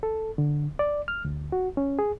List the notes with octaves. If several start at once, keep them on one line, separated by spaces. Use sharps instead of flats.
A4
D3
D5
F6
D2
F#4
C#4
G#4